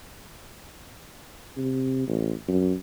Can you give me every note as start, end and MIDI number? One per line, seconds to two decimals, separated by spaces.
1.57 2.06 48
2.07 2.33 33
2.48 2.74 42